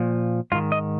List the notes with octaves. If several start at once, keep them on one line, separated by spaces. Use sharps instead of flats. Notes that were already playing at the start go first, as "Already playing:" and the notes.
Already playing: A#2 F3
G#2 D#3 F4
D#5